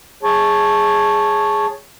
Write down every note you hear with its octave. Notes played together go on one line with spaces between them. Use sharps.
G#4 C#5 A5